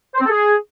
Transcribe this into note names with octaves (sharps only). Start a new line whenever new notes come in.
C5
C4
A4
G#4